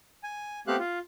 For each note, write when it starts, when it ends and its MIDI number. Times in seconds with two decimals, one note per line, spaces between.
0.24 0.60 80
0.67 0.76 57
0.67 0.76 59
0.67 0.76 60
0.67 0.76 67
0.67 0.76 77
0.67 0.76 90
0.79 0.99 65